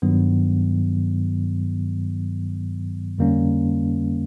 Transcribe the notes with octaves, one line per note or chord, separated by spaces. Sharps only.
G2 D#3 F#3 B3
F2 D3 G3 A#3 C#4